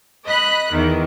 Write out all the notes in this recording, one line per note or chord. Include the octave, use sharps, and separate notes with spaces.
D#5 B5 F#6
E2 D#3